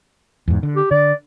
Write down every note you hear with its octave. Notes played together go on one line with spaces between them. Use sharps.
E2 G#2
D3
G4
D3 D5